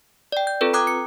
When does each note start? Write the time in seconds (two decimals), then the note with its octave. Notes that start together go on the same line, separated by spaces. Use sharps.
0.32 D5 G5
0.47 G6
0.61 C4 F4 A4 B4
0.73 G5 A#5 D6 D#6 F#6 G#6
0.87 C#7